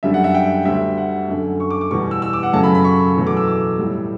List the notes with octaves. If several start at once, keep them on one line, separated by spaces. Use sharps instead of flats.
F#2 D3 G3 E5
F#5
E5
G5
D2 D3 G3 E5
F#5
F#2 D3 A3
C#6
D6
D6
E2 B2 G3 C#6
E6
E6
D6
F#5
F#2 C#3 F#3 A3 A5
B5
B5
C#6
E2 B2 F#3 A3
D6
E6
D6
A2 G3